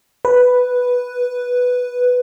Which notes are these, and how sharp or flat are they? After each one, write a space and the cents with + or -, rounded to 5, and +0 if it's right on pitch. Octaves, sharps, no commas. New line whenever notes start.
B4 +0